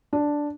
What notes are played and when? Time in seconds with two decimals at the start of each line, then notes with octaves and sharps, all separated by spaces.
0.13 D4